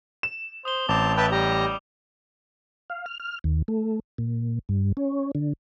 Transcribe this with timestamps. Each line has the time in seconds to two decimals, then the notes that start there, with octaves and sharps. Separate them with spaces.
0.23 E7
0.65 C5 D#6 G7
0.89 A1 C4 A5 D6 F7
1.17 E4 B4 G5 A5
1.31 G3 G4 A#5
2.90 F5
3.06 F6
3.20 F6
3.44 D#2
3.68 A3
4.18 A#2
4.69 G2
4.97 C#4
5.35 D3